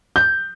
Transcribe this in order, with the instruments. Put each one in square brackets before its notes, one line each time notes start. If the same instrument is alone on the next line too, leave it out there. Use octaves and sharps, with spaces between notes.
[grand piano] G6